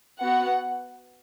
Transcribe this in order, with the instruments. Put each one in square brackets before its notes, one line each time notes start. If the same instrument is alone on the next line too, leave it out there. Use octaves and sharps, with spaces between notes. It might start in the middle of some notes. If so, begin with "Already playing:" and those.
[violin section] B3 F#4 F#5